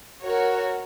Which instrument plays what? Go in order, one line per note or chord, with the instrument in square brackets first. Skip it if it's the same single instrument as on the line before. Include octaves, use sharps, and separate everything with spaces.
[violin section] F#4 A#4 C#5